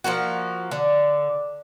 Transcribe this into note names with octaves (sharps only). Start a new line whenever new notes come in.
F3 F#3 A#3 F#4
D3